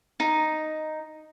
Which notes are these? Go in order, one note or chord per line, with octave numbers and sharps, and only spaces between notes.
D#4